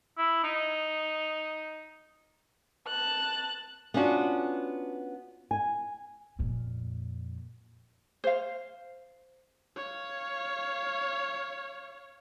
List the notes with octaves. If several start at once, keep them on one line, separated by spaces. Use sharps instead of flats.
E4
D#4
A5 F#6
B3 C#4 D4 F4 F#4
G#5
F2 A#2
C5 F5
C#5 F5